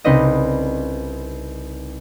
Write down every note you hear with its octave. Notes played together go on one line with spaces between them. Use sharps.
C2 C#3 C4 D#4 B4 D#5